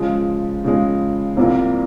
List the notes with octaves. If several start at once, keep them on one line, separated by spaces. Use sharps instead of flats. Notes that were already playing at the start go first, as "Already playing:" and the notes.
Already playing: C#3 F3 G#3
C#3 F3 G#3
C2 C3 F3 A#3 E4